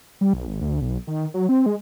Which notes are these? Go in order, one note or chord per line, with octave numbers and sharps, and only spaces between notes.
G3
B1
G#1
D2
B1
D#3
F#3
C4
G#3